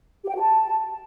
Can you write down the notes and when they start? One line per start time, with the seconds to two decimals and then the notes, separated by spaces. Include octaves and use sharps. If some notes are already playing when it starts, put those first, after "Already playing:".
0.24 G4
0.29 G5
0.35 F#4
0.40 A5